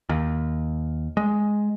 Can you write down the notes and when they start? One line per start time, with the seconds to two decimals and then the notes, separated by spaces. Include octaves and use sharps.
0.09 D#2
1.17 G#3